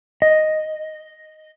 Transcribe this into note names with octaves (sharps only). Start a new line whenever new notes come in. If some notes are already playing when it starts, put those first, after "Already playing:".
D#5